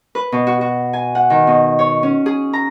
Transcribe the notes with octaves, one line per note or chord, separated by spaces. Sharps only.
B4
B2
F#4
F#4
G#5
F#5
D#3
B2
C#5
C#4
G#4
A#5